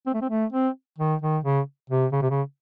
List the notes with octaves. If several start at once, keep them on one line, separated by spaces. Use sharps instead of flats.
C4
A3
C4
A3
C4
D#3
D#3
C#3
C3
C#3
C3
C#3